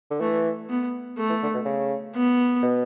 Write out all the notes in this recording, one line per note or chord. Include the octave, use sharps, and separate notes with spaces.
D3
E3 A3
B3
A3
E3
D3
B2
C#3
B3
B2